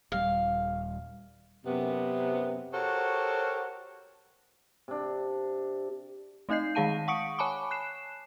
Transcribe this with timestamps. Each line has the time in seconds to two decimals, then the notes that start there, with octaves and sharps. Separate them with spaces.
0.12 D#1 G3 F5
1.65 F#2 C3 B3
2.73 F#4 G4 A4 A#4 C5 C#5
4.88 C3 D4
6.49 A3 C4 D#4 D#5 G6 C7
6.75 D#3 G#3 G#4 F5 A5 D#7
7.08 F#5 C#6 D#6 C#7 D7
7.39 C#5 G#5 A5 B5 C#6 D6
7.71 F#6 C7 E7